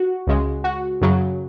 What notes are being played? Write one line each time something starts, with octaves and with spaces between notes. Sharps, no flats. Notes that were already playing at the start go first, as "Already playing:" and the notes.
Already playing: F#4
C#2 C#3 G#3
F#4
F#2 C#3 F#3